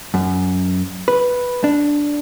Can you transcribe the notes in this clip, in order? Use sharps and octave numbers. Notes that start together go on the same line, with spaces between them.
F#2
B4
D4